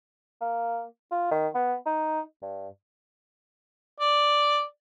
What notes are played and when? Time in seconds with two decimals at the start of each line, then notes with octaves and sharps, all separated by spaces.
0.41 A#3
1.11 F4
1.31 D#3
1.55 B3
1.86 D#4
2.42 G2
4.00 D5